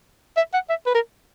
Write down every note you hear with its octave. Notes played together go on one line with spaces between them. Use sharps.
E5
F#5
E5
B4
A#4